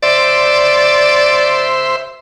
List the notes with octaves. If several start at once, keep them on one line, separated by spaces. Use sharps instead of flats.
C5 D5 E5